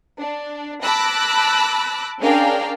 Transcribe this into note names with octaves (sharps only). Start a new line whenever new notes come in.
D4
A5 B5 D6 E6 F#6 A#6
C#4 D4 G#4 A#4 F5 G5